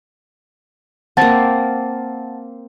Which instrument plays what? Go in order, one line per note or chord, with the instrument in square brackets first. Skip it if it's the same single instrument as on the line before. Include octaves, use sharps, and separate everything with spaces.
[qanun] A#3 C4 [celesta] F#5 A5 A6